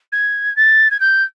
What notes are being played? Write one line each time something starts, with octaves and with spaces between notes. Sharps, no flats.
G#6
A6
G#6
G6